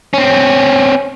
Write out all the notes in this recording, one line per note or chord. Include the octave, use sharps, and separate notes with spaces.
C4 C#4